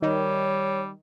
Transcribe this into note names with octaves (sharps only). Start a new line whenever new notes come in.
D#3 G3 C#5